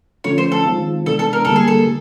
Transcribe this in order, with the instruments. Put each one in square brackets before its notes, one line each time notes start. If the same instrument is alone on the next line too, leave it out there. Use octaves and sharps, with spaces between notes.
[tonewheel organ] D3 F3 A3 C#4 [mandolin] C#5
[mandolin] C5
A4
[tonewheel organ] D#3 G#3 C4 F4
[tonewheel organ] C3 E3 G#3 B3 D4 [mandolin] A4
[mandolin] A4
A#4
[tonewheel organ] D3 G3 A#3 [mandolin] A4
[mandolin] G#4
A4